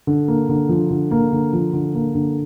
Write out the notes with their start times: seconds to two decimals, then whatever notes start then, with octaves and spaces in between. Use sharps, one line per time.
0.07 D3
0.28 A#3
0.49 D3
0.69 F3
0.90 D3
1.11 A#3
1.32 D3
1.53 F3
1.73 D3
1.95 A#3
2.15 D3